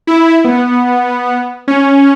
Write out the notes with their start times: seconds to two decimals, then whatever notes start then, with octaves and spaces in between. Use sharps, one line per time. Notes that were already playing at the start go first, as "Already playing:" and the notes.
0.07 E4
0.44 B3
1.68 C#4